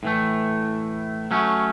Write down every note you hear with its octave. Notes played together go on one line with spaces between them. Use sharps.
A2 E3 A3
F#3 A3 C#4